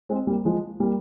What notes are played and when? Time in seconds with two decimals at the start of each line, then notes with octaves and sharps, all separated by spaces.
0.09 G#3 C4
0.27 G3 A#3
0.45 F3 G#3
0.80 G3 A#3